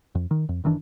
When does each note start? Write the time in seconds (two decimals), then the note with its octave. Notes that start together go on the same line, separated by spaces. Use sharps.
0.15 F2
0.31 D#3
0.49 F2
0.64 F#1 D#3 E3 D4